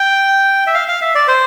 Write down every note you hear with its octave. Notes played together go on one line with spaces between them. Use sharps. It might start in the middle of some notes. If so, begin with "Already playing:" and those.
Already playing: G5
E5
F5
F5
E5
D5
C5